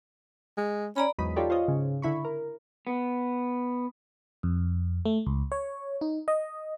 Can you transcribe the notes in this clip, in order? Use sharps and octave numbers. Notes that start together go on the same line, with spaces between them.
G#3
C#4 D5 A#5 B5
E2 G#2 F#3 D#4 B5 D#6
D#4 F4 G4 A4 C#5 D5
F4 C5 C#5 D#5
G#2 C#3
D3 E4 B5 C#6
A#4
B3
F2
A3
C#2
C#5
D#4
D#5